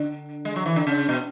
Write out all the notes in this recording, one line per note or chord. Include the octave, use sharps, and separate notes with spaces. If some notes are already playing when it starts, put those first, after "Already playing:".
Already playing: D3
G#3
F#3
E3
D3
C#3
B2